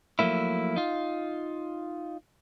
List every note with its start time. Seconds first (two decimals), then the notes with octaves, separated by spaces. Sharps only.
0.19 F3 F#3 A3 A#3 E4
0.76 D#4 F4